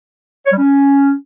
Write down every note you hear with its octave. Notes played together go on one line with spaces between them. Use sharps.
C#5
G3
C#4